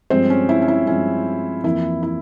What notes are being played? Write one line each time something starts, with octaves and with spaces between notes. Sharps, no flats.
G2 F3 G#3 C4 C5
C#4
E4
C#4
E4
G2 F3 G#3 C#4
F2 E3 A#3 E4
E4